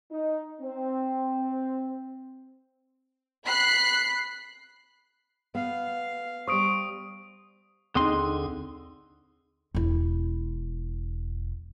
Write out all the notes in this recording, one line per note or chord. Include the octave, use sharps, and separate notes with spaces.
D#4
C4
B5 F#6 C7
B3 F5
G3 C5 C#6 D#6 D7
D#2 D3 C4 D#4 G#4 C6 D#6
E1 E4